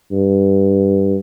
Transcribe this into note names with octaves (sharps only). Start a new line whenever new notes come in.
G2